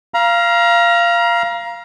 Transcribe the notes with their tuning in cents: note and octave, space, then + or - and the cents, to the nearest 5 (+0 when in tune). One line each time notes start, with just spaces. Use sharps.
F5 -15 A#5 +30